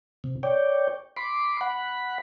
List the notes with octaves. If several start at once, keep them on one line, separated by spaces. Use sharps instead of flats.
C3
C#5 D5 G5
B5 C6 D6
F#5 B5